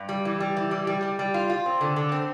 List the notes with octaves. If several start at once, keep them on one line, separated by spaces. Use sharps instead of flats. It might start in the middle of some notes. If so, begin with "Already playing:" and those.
Already playing: G2
G3
E3
G3
E3
G3
G3
G3
G3
F4
F4
C4
D3
D3
C4